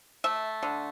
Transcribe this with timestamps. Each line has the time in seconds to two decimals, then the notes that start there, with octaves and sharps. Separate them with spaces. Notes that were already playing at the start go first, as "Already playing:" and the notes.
0.24 A3 E5
0.63 D3